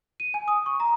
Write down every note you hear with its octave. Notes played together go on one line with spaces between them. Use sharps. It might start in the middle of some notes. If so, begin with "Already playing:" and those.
D#7
G#5
D#6
C#6
A#5